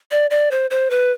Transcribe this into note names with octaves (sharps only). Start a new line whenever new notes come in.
D5
D5
C5
C5
B4